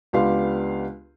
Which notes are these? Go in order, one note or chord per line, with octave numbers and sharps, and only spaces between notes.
C#2 B3 D4 G4 F5 C6